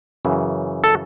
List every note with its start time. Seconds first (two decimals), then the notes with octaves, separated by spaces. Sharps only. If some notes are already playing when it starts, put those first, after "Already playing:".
0.25 F#2 C#3 E3
0.84 A4